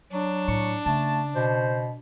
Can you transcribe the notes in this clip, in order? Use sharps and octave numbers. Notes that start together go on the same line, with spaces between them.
F#3 D4
A2 C#6
C#3 A3 A5
B2 C5